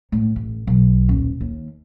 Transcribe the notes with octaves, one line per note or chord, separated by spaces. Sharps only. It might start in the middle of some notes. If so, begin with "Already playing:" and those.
A2
A1
B1
D#1
D#2